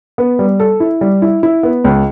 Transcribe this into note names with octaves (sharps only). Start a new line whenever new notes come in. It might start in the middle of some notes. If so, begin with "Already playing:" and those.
B3
G3
A4
E4
G3
E4
E4
B3
C#2